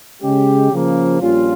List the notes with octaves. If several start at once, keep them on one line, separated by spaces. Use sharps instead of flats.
C#3 G#3 C#4 G4
C#3 F3 A#3
A#1 A#2 G3 C#4 F4